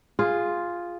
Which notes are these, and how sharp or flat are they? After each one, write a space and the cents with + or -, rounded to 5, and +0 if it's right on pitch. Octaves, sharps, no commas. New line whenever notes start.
F4 +0 G#4 -10